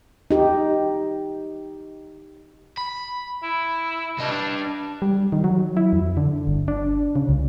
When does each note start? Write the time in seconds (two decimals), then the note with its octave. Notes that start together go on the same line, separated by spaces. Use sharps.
0.31 D#4 G4
2.77 B5
3.42 E4
4.18 G2 C3 D#5
4.31 D4
5.02 G3
5.32 D#3
5.44 F#3
5.77 E4
5.93 F2
6.17 D3
6.47 G1
6.68 D4
7.16 C#3
7.29 C#2